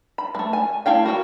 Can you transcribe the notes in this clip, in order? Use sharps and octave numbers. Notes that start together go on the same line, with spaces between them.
B5
G#3 A3
G#5
A3 E4 F5 G5
F#4 A#4 G5